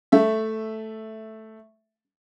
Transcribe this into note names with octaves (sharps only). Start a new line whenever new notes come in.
A3 A4 E5